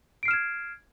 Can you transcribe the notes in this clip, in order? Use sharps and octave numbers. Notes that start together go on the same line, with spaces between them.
F6 G#6 C7 D7 E7